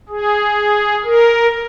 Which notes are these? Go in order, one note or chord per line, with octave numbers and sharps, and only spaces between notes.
G#4
A#4